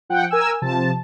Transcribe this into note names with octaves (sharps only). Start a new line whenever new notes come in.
F3 F#5 G5
A#4 G#5 E6
C3 F3 A5